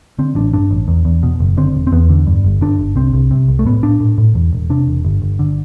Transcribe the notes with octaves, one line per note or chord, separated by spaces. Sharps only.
D3 C4
A1 D4
G2 D4
A1
E2
E2
B2
F#1
D3 C4
E1
C4
E2 B3
D3
G2
G1
G1 D4
G1
C2 C4
C2
C3
C2
A3
A2 B3
A2 D4
A2
A2
E2
E1
C3 D4
E1
G1
G1
D3